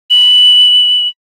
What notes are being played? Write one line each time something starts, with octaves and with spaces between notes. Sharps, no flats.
F#7